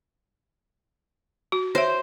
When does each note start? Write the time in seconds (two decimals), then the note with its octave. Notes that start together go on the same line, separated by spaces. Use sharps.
1.52 F#4
1.75 C5 C#5 E5